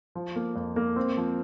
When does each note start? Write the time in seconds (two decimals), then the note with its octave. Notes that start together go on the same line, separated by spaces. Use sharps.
0.15 F3
0.36 A#3
0.56 F2
0.76 A#3
0.96 C4
1.17 F3